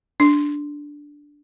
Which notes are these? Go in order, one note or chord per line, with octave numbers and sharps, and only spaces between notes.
D4